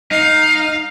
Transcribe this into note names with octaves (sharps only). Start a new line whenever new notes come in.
D#4 F5